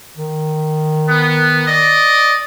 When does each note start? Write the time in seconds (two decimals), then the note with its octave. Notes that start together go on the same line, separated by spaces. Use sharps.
0.17 D#3
1.09 B3
1.67 D5 D#5